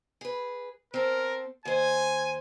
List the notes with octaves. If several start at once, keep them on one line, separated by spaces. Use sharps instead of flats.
G#4 B4
C4 A4 A#4
D#2 C5 G#5